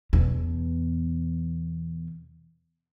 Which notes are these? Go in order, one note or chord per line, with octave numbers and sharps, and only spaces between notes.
E2 B2